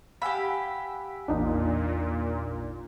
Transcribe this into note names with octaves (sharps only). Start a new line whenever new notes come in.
G4 F5 F#5 G#5 B5 E6 B6
A1 E2 A#2 D4 D#4 F4